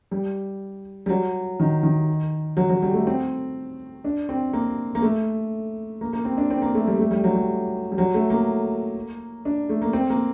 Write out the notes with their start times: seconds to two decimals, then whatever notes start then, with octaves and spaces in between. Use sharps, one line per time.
0.11 G3
1.06 G3
1.09 F#3
1.60 D#3
1.83 D#3
2.57 F#3
2.69 F#3
2.82 G3
2.93 A3
3.07 C4
4.04 D4
4.29 C4
4.54 A#3
4.95 A#3
5.02 A3
6.01 A#3
6.13 A#3
6.25 C4
6.38 D4
6.50 C4
6.62 A#3
6.75 A3
6.87 G3
6.99 A3
7.11 G3
7.24 F#3
7.35 G3
7.92 G3
7.98 F#3
8.14 A3
8.30 A#3
9.45 D4
9.69 A3
9.82 A#3
9.93 C4
10.10 A#3